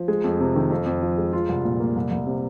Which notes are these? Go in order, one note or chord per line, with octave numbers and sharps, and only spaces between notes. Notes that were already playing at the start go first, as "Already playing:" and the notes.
Already playing: F3
G#3
F2
C3
D#3
F2
F2
F3
G#3
F4
C2
A#2
A#3
C2
C2
C3